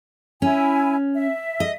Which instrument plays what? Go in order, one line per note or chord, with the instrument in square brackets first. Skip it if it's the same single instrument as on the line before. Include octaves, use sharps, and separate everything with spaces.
[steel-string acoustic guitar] C#4 [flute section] E4 G#5
[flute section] E5
[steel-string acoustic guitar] D#5